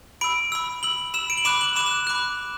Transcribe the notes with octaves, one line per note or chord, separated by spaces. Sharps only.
B5 E6 D7
B5 E6
B5 E6 F#7
B5 E6 E7
D7
F#7
B5 D6 F#6 E7
F#7
B5 D6 F#6 E7
E7
B5 D6 F#6